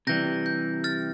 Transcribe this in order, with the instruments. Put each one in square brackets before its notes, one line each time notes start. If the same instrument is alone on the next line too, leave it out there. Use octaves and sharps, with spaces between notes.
[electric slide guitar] C3 E3 G3 [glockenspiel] G6 A#6
[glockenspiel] G6
F6 A6